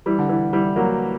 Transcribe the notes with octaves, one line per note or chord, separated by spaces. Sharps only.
E3 G3
D3
E3
E3 G3
F#3 A#3